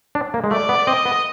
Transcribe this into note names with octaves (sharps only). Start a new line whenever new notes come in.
D4
A#3
G#3
A3 D5
B3
C4 D#5
B3